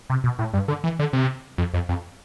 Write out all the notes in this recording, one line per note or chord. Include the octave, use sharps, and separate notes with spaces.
C3
B2
A2
G2
D3
E3
D3
C3
F2
F2
F2